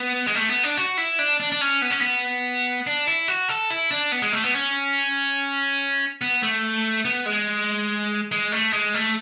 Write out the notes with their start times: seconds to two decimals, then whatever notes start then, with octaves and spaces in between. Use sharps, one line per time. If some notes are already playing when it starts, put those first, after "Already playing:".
Already playing: B3
0.27 G#3
0.35 A3
0.49 B3
0.63 D4
0.77 F#4
0.97 E4
1.19 D4
1.40 D4
1.52 D4
1.61 C#4
1.82 B3
1.91 C#4
2.01 B3
2.87 D4
3.07 E4
3.28 F#4
3.49 A4
3.70 E4
3.91 D4
4.12 B3
4.22 G#3
4.33 A3
4.44 B3
4.54 C#4
6.21 B3
6.43 A3
7.05 B3
7.26 G#3
8.32 G#3
8.52 A3
8.73 G#3
8.94 A3